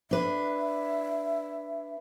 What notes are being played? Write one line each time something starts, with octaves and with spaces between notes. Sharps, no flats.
D4 B4 E5